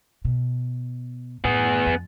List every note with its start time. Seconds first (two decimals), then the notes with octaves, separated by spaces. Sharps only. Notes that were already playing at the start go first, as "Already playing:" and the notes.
0.25 B2
1.44 F#2 A2 B3 G#4
1.87 F2